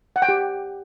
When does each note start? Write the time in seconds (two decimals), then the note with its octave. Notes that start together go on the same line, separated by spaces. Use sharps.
0.16 F#5
0.22 G5
0.29 G4